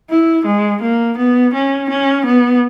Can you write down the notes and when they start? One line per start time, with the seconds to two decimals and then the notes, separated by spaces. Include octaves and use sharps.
0.10 E4
0.45 G#3
0.82 A#3
1.17 B3
1.54 C#4
1.90 C#4
2.25 B3